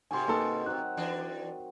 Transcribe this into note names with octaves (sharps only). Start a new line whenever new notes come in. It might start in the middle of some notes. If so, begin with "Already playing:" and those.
G#2 C3 D#3 F#4 G4 G#5 C6
A#3 D#4 A4 B4 D#5 C6
F#3 C4 D#4 F#6
E3 D4